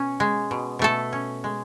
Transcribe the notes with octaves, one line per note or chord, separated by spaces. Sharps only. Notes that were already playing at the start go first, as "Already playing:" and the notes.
Already playing: B2 C#4
G#3
B2
B2 A3 A4
C#4
G#3